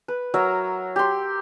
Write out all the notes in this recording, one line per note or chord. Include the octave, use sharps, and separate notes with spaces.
B4
F#3 A#4 E5
G4 C6